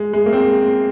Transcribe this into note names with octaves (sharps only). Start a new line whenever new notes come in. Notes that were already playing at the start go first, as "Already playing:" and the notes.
Already playing: G#3
G#3
A#3
C4